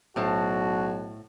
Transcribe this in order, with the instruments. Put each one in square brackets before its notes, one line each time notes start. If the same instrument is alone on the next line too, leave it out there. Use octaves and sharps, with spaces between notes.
[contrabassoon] B1 [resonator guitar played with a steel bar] A2 C5 A5 [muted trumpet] F#4